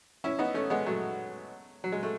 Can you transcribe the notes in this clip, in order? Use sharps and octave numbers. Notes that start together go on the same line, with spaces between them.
C#4 E4
B3 D#4
A3 C#4
G#3 B3
F#3 A3
F#3
G#3
A3